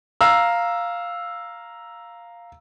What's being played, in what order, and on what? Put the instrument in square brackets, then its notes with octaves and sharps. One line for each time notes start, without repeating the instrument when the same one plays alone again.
[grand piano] F5 A#5 E6